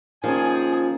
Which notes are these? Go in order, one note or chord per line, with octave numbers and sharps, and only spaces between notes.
D#3 F3 A#3 C#4 G#4 G#5